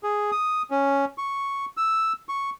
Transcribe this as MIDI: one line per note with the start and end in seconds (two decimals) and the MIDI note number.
0.03 0.31 68
0.31 0.62 87
0.71 1.05 61
1.18 1.66 85
1.77 2.13 88
2.29 2.50 85